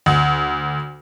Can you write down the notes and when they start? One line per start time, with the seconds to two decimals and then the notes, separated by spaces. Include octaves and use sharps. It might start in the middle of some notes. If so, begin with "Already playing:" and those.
0.06 D2